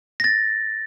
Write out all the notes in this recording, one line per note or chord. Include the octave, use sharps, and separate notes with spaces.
A6 A#6